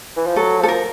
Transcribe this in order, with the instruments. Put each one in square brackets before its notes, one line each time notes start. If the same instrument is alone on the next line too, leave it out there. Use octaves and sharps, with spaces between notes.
[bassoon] E3
F3
[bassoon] F#3 [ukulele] A4
[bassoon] F3 [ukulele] A4
[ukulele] A#4